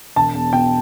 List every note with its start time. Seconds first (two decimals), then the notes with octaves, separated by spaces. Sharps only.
0.16 E1 A5
0.35 E2
0.53 B2 G5